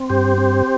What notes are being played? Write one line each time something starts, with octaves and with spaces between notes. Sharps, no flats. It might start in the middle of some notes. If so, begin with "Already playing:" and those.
Already playing: C4
G2 G4 C5
C4